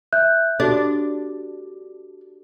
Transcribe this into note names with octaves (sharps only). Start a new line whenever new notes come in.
E5 F#6 G6
D4 F#4 G4 A4